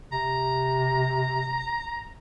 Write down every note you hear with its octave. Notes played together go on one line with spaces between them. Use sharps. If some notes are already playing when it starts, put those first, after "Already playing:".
C3 A#5